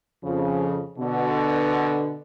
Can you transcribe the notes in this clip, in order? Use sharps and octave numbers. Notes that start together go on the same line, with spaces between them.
F2 C#3 F3
B2 D3 B3